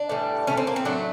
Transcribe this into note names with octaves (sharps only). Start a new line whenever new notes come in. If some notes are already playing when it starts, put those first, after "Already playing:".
Already playing: D4
A2 E3 G3
A2 F#3 A3 C#4
C4
A#3
C4
A2 F#3 A3 D4